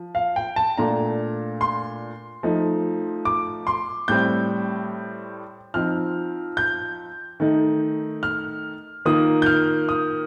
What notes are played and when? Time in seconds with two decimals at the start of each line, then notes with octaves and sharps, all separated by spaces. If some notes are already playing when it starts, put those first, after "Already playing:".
Already playing: F3
0.15 F5
0.36 G5
0.56 A5
0.78 A#2 A3 D4 A#5
1.61 C6
2.43 F3 A3 D#4
3.25 D6
3.67 C6
4.08 A2 G3 C4 G6
5.74 F3 C4 D#4 F6
6.57 G6
7.40 D#3 A3 D#4
8.23 F6
9.05 D#3 A#3 F4 D#6
9.42 G6
9.46 F6
9.89 D#6